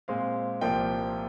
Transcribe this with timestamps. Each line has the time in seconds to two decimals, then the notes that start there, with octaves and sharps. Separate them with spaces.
0.08 A#2 G#3 C4 F5
0.61 C2 A#2 F3 A#3 G5